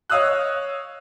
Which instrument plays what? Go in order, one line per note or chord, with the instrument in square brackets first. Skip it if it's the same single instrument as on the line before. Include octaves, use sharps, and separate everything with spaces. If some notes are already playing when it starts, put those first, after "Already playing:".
[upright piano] C#5 D#5 F5 D#6 E6 F#6